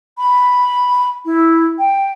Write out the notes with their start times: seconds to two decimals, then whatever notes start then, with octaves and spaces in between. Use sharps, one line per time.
0.18 B5
1.25 E4
1.78 G5